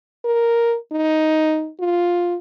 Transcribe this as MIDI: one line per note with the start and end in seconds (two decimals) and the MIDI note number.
0.25 0.76 70
0.92 1.70 63
1.80 2.37 65